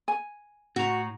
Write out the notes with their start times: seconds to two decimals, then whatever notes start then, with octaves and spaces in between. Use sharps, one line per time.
0.08 G#5
0.76 A2 F#4 A#5